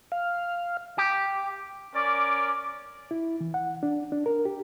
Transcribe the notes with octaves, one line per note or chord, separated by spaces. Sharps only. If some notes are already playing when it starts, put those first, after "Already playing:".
F5
G4
C#4 A#4 D5 D6
E4
E3
F#5
D4
D4
A#4
G4